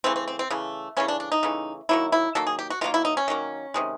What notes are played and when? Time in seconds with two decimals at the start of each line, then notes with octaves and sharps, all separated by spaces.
0.04 C#3 E3 A3 C4
0.16 C4
0.28 C4
0.39 C4
0.51 C#3 E3 A3
0.97 C#3 E3 A3 C#4
1.08 D4
1.20 D4
1.32 D#4
1.43 C#3 E3 A3
1.89 D#3 F#3 A#3 E4
2.12 E4
2.35 D#3 F#3 A#3 A4
2.47 G#4
2.59 G4
2.70 F#4
2.81 D#3 F#3 A#3 F4
2.94 E4
3.05 D#4
3.17 C#4
3.28 D#3 F#3 A#3
3.74 C3 D#3 G#3